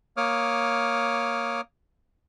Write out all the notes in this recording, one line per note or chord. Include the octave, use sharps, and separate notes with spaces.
A#3 C#5 D6 D#6 F6